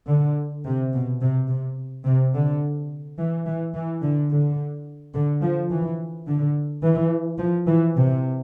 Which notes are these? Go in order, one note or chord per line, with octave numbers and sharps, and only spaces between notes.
D3
C3
B2
C3
C3
C3
D3
E3
E3
E3
D3
D3
D3
F3
E3
D3
E3
F3
E3
C3